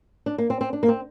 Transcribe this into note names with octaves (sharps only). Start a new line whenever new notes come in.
D4
A#3
C4
C4
D4
A#3
C4